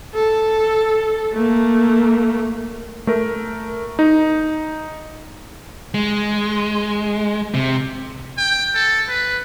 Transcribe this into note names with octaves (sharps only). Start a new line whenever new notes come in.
A4
A3 A#3
A3 A#4
D#4
G#3
C3
G5
A4
B4